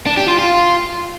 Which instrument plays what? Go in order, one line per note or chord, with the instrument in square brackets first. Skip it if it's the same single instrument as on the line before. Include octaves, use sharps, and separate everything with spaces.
[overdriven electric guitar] D4
G4
F4
F4